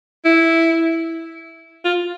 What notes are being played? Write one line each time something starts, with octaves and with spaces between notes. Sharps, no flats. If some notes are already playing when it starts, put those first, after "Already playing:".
E4
F4